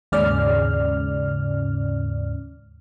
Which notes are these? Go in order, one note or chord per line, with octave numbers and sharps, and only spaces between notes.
D#2 G#2 C#3 C#4 D5 F6